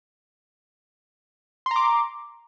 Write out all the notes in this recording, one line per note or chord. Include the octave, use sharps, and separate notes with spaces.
A#5 C6 D6